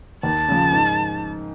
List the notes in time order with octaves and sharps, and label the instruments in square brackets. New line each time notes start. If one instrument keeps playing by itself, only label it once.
[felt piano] D#2 [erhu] A5
[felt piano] C#3 F3
G#2